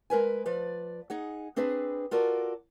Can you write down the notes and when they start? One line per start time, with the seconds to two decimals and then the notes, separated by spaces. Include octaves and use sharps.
0.10 G#3 A#4 B4 G#5
0.46 F3 B4 D5
1.10 D#4 G#4 F#5
1.56 C4 D4 G#4 B4
2.11 F4 F#4 A4 A#4 D5